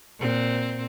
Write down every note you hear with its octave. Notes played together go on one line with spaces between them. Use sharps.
A#2 C4